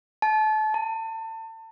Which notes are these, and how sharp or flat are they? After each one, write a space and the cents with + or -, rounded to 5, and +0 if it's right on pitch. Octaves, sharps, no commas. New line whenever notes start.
A5 -30
A5 +30